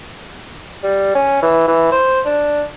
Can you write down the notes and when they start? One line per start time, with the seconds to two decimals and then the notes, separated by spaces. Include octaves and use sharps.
0.83 G3
1.15 C#4
1.42 E3
1.68 E3
1.92 C5
2.25 D4